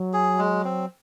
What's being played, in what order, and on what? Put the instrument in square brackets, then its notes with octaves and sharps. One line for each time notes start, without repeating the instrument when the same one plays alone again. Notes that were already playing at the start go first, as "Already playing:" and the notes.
Already playing: [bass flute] F#3
[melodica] G#4
G#3
C4